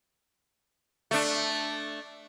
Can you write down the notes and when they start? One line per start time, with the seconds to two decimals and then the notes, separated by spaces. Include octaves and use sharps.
1.11 A3 D4